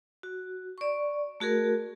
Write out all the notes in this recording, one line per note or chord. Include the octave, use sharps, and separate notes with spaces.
F#4
D5 C#6
A3 F#4 G#4 A#4